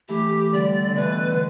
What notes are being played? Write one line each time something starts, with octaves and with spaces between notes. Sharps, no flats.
E3 A3 G4
D3 G3 D5
D3
B2 E3 B4
D3